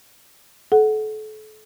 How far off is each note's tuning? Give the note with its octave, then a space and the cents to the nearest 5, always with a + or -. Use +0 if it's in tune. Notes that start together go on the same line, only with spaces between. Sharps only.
A4 -35 F#5 +0